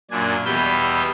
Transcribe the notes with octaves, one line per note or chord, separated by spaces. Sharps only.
F#2 A#2 D4 G#5
E2 B2 G3 B4 E6 G6